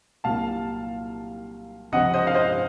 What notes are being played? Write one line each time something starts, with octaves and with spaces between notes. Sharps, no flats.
C2 A#2 F#3 F5 A5
C#2 C3 F3 D#5 F#5
C5 D#5
F5
C5 D#5